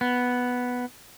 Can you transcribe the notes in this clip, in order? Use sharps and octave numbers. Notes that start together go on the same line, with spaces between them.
B3